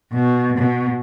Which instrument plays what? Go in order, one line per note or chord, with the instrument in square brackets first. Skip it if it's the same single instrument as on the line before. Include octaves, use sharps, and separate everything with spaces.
[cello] B2
B2